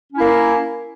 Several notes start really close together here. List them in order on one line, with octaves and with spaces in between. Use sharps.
C#4 E4 A#3